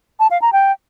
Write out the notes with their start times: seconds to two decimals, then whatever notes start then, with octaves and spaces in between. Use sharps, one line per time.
0.20 A5
0.31 F5
0.42 A#5
0.53 G5